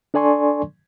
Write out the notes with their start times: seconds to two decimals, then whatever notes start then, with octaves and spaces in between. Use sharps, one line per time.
0.14 D4 A4 D5 G#5 C6 C#6